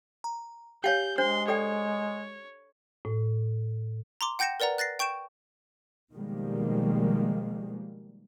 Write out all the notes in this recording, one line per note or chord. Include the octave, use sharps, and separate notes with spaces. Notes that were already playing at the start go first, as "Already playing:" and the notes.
A#5
G4 C#5 F5 G5 G#5 G6
G#3 D4 C5 C6
A4 C#5 D5 G5
A2
A#5 C6 D6
F#5 G5 G6 A#6 C#7 E7
A#4 B4 D5 F#5 A#5
F#6 A6 A#6 C7
G5 C#6 G6 D7 E7
B2 D#3 F3 G3 G#3 A#3